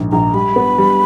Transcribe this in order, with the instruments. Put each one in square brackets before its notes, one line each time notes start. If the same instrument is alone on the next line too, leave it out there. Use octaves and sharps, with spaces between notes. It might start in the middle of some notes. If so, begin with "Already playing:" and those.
Already playing: [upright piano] A#1 G#2
[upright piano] A#1 [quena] A#5
[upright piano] G3 [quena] B5
[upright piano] B3
G3